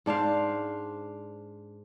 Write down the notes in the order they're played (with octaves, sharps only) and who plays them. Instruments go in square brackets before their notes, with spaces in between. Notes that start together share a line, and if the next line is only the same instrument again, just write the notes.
[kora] G#2 D4 C5 F5